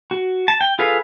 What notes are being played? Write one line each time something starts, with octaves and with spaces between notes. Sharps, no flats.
F#4
A5
G5
F4 G#4 A4 B4 F5